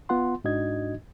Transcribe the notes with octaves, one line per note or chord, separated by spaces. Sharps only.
B3 F4 F#5 C6
G#2 D4 D#4 F#4 D#5 G#6